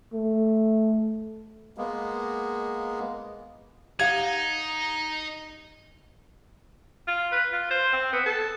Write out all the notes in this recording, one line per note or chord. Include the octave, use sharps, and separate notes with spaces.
A3
G#3 A#3 B3
D#4 G4 F5 F#5 G#6
F4
B4
F4
C5
C4
B3
A4